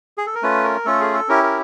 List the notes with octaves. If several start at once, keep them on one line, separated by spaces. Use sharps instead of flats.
G#4
A4
A#4
A3 C#4 F4 B4
A#4
A3 C#4 F4 A4
G#4
A4
C#4 E4 G4 A#4
A#4